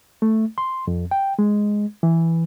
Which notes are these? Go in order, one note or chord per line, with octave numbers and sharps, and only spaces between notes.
A3
C6
F2
G5
G#3
E3